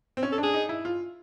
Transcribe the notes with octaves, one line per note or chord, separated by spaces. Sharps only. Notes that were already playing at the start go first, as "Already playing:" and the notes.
C4
C#4
A4
D4
G#4
D#4
E4
F4